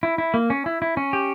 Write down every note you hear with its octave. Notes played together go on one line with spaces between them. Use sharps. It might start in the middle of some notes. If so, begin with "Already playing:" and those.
E4
E4
A#3
C#4
E4
E4
C#4
G4